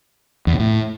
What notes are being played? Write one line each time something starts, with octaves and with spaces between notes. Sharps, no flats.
E2
B2
A2